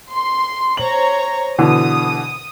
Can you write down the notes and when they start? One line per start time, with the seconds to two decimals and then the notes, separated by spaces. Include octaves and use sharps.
0.12 C6
0.77 C5 C#5 A#5 F#7
1.58 B2 D3 E3 D#6